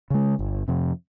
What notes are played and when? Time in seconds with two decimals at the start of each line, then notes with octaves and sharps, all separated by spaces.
0.10 C#3 G#3
0.39 G1
0.68 F2 C3